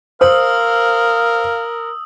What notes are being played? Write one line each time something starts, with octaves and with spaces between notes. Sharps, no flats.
A#4 C5 F5 D#6 E6 F#7